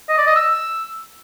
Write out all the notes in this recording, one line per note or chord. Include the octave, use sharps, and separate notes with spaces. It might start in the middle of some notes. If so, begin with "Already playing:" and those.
D#5
D5
D#5
E6